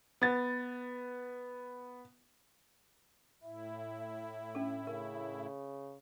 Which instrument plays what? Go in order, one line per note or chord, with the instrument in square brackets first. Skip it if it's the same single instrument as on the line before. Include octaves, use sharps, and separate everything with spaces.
[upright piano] B3 A6
[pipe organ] A2 E4 [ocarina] E5
[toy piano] C#4 D4 A4
[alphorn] C#3 [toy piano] A#4